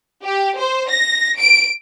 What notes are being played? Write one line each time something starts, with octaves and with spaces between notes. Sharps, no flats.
G4
C5
A#6
D7